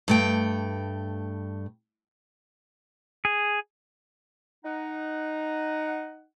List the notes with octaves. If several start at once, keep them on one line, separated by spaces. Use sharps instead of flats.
G2 A3 G5
G#4
D#4 F#5